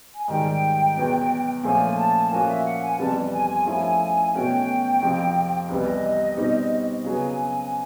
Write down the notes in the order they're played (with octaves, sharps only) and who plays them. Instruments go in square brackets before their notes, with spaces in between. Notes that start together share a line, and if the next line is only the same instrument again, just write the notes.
[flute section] G#5
[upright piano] G#2 D#3 G3 [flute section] G5
[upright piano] E2 B2 F#3 B3
[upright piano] A#2 F3 A3 C#4 [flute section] G#5
[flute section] A5
[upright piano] A#2 F3 A#3 C#4 F#4 [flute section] G#5
[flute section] E5
F#5
G#5
[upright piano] F2 C3 E3 G3 B3 [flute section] A5
[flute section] G#5
G#5
[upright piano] F3 A3 C#4 E4 A4 [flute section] G#5
[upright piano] B2 F#3 A3 C#4 F#4 [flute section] G5
[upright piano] F2 C3 F3
[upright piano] C2 C3 E3 G3 B3 [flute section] D#5
[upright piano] B2 G3 C4 D#4
[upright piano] C#3 F#3 B3 [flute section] G#5